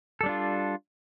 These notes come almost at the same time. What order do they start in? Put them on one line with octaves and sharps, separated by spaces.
A4 G3 D4 F4